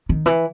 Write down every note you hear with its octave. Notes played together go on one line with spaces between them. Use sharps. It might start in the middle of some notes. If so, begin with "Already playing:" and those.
D#3
E3